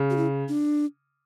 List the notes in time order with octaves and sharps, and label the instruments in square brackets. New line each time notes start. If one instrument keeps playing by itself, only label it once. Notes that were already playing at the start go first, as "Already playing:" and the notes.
Already playing: [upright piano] C#3
[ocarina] F#4
E4
D4